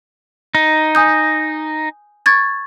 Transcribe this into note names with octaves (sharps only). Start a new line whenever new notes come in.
D#4
G#5 D#6 G6
C#6 G#6 A6